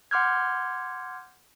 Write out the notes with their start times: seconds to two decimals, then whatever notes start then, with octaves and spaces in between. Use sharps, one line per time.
0.11 F#5 C6 D6 F6 G6 G#6